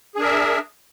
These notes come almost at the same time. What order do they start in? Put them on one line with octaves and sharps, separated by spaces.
G#4 D4 A#4 E5